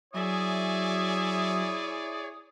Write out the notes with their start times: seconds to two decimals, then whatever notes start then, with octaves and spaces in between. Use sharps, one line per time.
0.14 F#3 E4 G#4 C#5 D5 E5 G#5 D#6